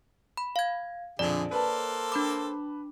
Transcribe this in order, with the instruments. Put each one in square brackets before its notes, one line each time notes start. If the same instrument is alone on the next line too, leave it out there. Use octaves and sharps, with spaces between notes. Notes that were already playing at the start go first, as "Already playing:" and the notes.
[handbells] B5
F5 G#6
[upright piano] A#1 F2 [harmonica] D3 G#4 [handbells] D5
[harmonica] A#3 A4 C5 [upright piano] B4 A5
[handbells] D4 B5 D6